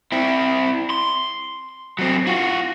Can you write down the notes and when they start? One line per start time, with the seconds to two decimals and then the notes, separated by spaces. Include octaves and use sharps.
0.12 C4 E4
0.90 C6
1.99 F#3 C4
2.27 F4 F#4